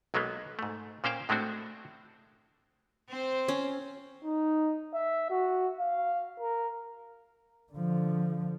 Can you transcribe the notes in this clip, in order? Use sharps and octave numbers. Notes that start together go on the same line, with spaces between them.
B1 F#3 G#3 A#3 B3
G#2 A3
A#2 A#3 C#4 C5 F5 G5
A2 G#3 A3 C4 D4 F#4
C4 C5
C#4
D#4
E5
F#4
F5
A#4
D3 F3